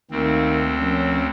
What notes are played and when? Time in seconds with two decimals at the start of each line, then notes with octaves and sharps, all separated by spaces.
0.11 D2 D#3 A#3 C4
0.80 F3 A#3 C#4